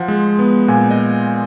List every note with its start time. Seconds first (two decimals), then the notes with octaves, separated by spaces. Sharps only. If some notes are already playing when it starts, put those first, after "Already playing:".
Already playing: F3 F#5
0.08 G#3
0.39 B3
0.68 A#2 G#5
0.91 D#5